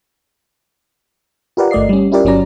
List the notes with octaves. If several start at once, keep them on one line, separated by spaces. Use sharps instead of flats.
F4 G4 A#4 B4 D5 F#5
G1 A3 D5 D#5 C7
G3 C#4
C#4 E4 F4 G4 A#4 D5
G1 F#3 C#4 D5 A#5